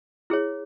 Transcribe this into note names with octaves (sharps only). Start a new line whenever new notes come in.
E4 G#4 C#5